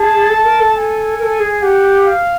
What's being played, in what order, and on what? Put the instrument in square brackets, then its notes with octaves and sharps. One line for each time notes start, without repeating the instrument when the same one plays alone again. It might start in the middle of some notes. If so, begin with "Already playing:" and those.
Already playing: [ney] G#4 [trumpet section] A5
[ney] A4
A#4
A4
[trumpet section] G#5
[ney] A#4
A4
G#4
[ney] G4 [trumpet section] F#5
[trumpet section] F5